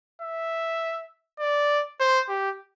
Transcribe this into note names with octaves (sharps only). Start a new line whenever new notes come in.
E5
D5
C5
G4